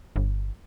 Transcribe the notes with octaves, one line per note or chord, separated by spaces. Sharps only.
G1